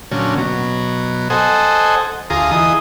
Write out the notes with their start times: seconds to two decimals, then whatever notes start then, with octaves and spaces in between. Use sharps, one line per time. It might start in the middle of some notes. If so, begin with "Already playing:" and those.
0.11 A#2 D3 F#3 C#4
0.38 B2 F#3
1.30 A4 C5 D#5 F#5 G#5
2.30 D2 F4 G#4 A#5 D#6
2.51 E3 G#4 D#5 D#6